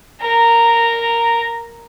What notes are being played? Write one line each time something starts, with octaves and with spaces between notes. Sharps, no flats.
A#4 A#5